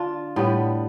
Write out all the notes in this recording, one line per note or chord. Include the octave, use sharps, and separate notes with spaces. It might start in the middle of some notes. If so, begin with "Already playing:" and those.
Already playing: D3 D4 F4
A2 G3 B3